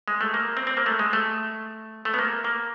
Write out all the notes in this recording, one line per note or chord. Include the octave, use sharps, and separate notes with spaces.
G#3
A3
A#3
C4
C4
A#3
A3
G#3
A3
A3
B3
A#3
A#3